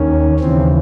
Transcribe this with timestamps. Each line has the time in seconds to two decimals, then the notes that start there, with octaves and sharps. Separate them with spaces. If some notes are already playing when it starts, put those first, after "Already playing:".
Already playing: D#2 D#3 C#4
0.40 D#2 C#3 E3 C4